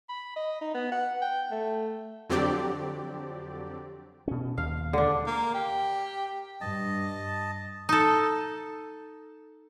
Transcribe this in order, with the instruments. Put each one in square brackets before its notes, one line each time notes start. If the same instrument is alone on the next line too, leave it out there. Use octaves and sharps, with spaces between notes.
[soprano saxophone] B5
D#5
D#4
B3
F#5
G5
A3
[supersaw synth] F2 D3 F#3 C4 G4 D5
[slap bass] B2 C#4
[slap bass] D#2 [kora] F5
[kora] D3 D4
[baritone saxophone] A#3
G4
[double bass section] G2 [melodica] D#5 A5
[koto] D#4 A4